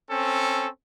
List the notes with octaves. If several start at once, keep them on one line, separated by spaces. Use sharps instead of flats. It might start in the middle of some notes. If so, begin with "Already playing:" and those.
C4 C#4 A4